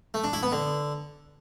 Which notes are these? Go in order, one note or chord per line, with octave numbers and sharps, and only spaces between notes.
A3
D4
E4
B3
D3